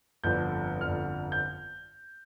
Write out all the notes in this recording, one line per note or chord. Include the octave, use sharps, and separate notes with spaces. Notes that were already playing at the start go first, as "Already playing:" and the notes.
G1 F2 D3 F3 G6
G1 F2 D3 F3 F6
G6